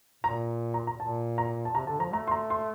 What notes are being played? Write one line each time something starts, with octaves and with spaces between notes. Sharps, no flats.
A#2 A#5
A#5
A#5
A#2 A5
A#5
A5
C3 A#5
D3 A5
F3 A#5
A3 A#5
C6
A#5
C6